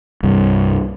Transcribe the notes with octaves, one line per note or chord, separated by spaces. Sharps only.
C2 G2